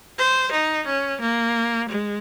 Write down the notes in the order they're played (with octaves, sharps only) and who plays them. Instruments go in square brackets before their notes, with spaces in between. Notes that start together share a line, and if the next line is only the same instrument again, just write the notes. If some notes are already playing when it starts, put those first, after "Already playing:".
[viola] C5
D#4
C#4
A#3
G#3